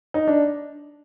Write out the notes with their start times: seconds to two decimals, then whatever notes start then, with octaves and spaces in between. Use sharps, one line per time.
0.14 D#4
0.27 D4